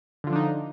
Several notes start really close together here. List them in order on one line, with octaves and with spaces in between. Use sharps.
D3 F4 F3 D4 D#4